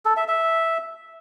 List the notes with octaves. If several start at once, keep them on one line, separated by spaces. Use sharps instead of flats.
A4
E5
E5